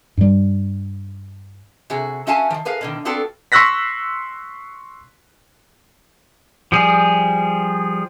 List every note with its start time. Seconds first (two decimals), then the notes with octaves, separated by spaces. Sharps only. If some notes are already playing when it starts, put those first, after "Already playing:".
0.17 G2 G3
1.90 C3 F#4 G#4
2.27 C#4 F#4 E5 F5 G#5 A5
2.50 D#3 F3
2.65 G#4 A#4 B4 F5
2.81 B2 D3 D#3
3.05 B3 C4 D4 F4 F#4 A4
3.52 C6 C#6 E6 F#6 A#6 B6
6.72 F3 G3 G#4